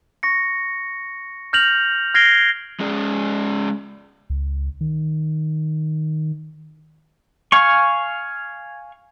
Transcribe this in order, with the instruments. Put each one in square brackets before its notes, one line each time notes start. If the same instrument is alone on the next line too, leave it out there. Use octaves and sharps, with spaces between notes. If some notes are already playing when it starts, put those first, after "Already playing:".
[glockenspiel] C#6 A#6 C#7
F6 G6 A#6 F7 F#7
F6 G#6 A#6 C7 D7 G7
[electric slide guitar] G#3 C#4 G#4 D5
[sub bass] C#2
D#3
[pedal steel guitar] F5 G#5 C#6